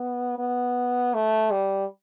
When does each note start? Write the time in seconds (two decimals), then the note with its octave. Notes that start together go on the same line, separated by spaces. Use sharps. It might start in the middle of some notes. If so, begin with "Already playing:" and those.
Already playing: B3
0.38 B3
1.14 A3
1.51 G3